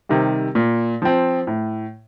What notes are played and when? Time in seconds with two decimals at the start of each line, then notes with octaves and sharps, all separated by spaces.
0.09 C3 D#3 G3
0.55 A#2
1.02 F3 C4
1.47 A2